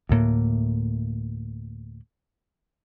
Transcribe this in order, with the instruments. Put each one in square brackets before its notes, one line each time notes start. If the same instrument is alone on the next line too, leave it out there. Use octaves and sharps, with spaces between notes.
[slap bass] D2 A2 A#3